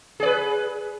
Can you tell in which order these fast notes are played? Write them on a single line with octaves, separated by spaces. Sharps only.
G#4 D5 B4